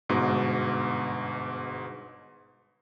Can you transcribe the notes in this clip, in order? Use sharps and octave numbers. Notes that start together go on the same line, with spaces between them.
G1 G#2 B2